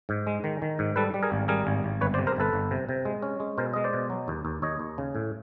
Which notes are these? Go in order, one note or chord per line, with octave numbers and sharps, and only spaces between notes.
G#2
G#3
D#3
D#3
G#2
G3 A4 B4
G3
G#4 A#4
G#1
G3 G#4 A#4
G#1
G#1
G1 B4 C#5
C5 D5
C3
A#4 C5
G1 A4 B4
G1
C3
C3
G#3
C#4
G#3
B2 A#4 C5
G#3 D#5
C5 D5
B2
F#3
D#2
D#2
D#2 C#5 D#5
D#2
C#3
A2